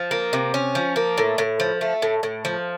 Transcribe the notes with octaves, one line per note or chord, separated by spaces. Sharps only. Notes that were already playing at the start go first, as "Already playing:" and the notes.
Already playing: F3
A#3
C3
C#4
F3
A#3
A2
A2
F3
A3
A2
A2
F3